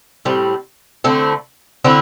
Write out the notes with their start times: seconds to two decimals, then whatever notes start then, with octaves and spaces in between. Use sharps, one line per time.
0.25 A2 G3 C4
1.04 D3 A3 C4 E4
1.84 D3 A3 C4 E4